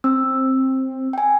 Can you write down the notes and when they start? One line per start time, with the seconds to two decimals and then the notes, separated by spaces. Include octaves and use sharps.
0.04 C4 E6
1.13 G5 G#5